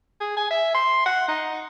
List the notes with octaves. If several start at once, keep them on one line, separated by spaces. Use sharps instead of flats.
G#4
G#5
E5
C6
F#5
D#4